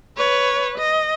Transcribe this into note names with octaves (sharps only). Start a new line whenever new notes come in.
B4 C#5
D#5